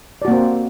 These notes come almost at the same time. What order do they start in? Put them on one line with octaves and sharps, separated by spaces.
D5 F#4 A#3 C4